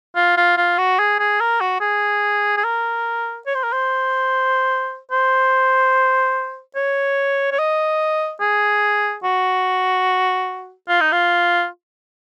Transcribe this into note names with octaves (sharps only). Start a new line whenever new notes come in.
F4
F4
F4
F#4
G#4
G#4
A#4
F#4
G#4
G#4
A#4
C#5
C5
A#4
C5
C5
C#5
C#5
D#5
G#4
F#4
F4
D#4
F4